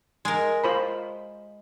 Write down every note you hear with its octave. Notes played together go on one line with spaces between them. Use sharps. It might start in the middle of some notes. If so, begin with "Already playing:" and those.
G#3 A#4
F4 C5 B5